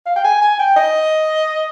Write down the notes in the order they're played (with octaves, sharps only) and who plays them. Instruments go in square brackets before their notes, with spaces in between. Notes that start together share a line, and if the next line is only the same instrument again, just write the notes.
[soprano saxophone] F5
G5
G#5
G#5
G5
D#5